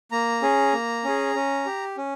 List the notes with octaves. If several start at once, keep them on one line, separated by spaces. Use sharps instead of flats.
A#3 A#5
C#4 G#4
A#3
C#4 G#4
C#4
G4
C#4